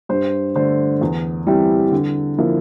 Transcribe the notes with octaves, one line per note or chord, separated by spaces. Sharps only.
G2 C5
D3 A3 D4 C5
E2
E3 G3 C4 E4
D3
F3 A#3 E4